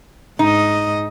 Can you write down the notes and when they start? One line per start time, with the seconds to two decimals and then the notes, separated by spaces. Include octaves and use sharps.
0.39 G#2 D#4 D#5